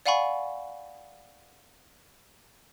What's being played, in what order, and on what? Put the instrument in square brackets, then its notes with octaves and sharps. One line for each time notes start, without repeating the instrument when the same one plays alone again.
[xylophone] D5 F5 F#5 G#5 B5 C#6